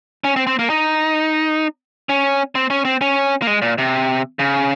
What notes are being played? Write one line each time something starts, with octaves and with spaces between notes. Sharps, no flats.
C#4
C4
C4
A#3
D#4
C#4
C4
C#4
C4
C#4
A#3
G#3
A#2
C3
C#3